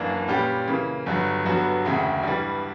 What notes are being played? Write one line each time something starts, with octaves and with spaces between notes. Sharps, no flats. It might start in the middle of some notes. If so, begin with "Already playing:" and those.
Already playing: F#1 F#2 E3 A#3 D4
A#2 G3 C#4 G4 B4
C#3 E3 A#3
G1 G2 F#3
G1 G2 F#3 B3 F#4
E1 D2 C#3
G2 E3 G3